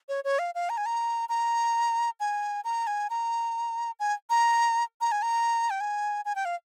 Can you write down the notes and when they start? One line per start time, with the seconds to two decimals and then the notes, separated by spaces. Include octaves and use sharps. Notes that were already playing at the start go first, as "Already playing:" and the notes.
0.09 C#5
0.24 C#5
0.39 F5
0.55 F5
0.70 A#5
0.77 G#5
0.86 A#5
1.29 A#5
2.20 G#5
2.64 A#5
2.87 G#5
3.10 A#5
4.00 G#5
4.30 A#5
5.01 A#5
5.12 G#5
5.22 A#5
5.70 G5
5.81 G#5
6.25 G#5
6.35 G5
6.45 F5